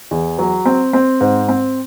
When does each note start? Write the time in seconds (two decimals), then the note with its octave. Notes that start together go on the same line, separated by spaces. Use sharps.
0.11 E2
0.39 F#3
0.66 C4
0.93 C4
1.21 G#2
1.49 C4